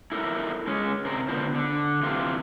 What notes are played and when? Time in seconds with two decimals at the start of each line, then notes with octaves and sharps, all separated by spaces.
0.12 E4 A4 A#4
0.67 G#3 C#4
1.05 C3 C4 A#4
1.28 D3 B3 F4 C5
1.55 D3
2.03 C3 E3 F4